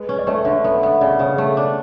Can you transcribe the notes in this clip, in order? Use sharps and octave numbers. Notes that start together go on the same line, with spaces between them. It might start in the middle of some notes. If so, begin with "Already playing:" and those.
Already playing: G#3 B4
C#4
D5
A3 C#5
E5
D3 D5
B3 E5
B3 E5
C#3 D5
C#3 C#5
A3
D4